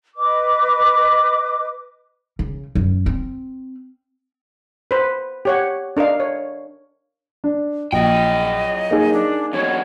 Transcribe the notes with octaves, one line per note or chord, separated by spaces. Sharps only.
B4 D#5 D6
C#3
F#2
C4
B4 C5
G4 C#5 F#5
D4 A#4 D#5 F5
C#5
D4
A#1 F#3 D#5 G5
A#3 D#4 G#4
D4
E2 F#3 C#5